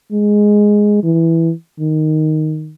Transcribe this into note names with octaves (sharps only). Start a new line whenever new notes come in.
G#3
E3
D#3